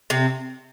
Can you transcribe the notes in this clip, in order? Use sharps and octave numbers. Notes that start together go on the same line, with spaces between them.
C3 C4